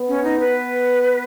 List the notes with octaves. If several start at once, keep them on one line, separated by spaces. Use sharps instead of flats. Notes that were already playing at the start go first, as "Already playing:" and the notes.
Already playing: B3
C#4
D#4
B4